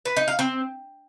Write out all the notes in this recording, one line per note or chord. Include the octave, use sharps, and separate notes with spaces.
B4
D#4
F5
C4